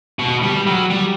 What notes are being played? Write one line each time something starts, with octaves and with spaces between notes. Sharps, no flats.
B2
G3
F#3
G3